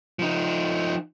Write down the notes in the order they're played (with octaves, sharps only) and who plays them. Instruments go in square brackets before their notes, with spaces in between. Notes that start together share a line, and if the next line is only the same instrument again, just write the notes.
[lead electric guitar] F3 D#4